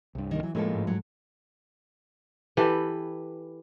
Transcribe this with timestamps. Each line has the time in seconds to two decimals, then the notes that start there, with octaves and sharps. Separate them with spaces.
0.15 C2 G2
0.31 D#3 G3 A#3
0.43 E3 F#3
0.55 A2 E3 F3 G#3 A#3 A4
0.73 G#2
0.87 F#3
2.57 E3 G4 A4 B4